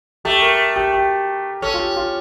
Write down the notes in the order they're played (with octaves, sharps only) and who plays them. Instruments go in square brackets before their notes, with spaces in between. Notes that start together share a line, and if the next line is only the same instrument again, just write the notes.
[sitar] A3 [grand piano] G4
[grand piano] A#4
G4
G4
[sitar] C#4 [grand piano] A4
[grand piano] F4
G4
F4